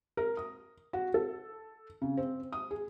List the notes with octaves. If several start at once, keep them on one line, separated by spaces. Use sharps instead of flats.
A#4
D#6
F#4
A4
C#3
C4
D#6
G#4